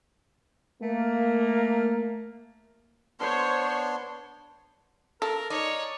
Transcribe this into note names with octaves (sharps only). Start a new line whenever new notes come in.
A3 A#3
B3 D4 C5 C#5 C6
A4 A#4
D#4 C#5 D5